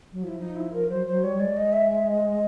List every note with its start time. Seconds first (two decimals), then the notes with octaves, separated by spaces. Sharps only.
0.13 F#3
0.23 F3 E4
0.40 D#4
0.56 E4
0.73 A#4
0.89 F#3 C5
1.07 F#3 C5
1.23 G3 C#5
1.40 G#3 D5
1.57 D#5
1.73 E5
1.90 E5
2.06 D#5